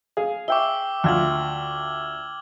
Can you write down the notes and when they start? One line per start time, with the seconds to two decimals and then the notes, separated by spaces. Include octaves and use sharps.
0.17 G#4 F5
0.48 E5 G5 C#6 D6 E6 G7
1.04 D2 F4 F6 G#6 F#7